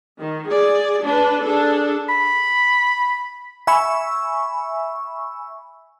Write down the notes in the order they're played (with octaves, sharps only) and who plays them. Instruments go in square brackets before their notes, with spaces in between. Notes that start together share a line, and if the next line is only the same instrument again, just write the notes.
[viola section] D#3
G#4 D5
D4 B4
D4 G#4 A4
[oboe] B5
[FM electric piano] E5 G#5 B5 C#6 E6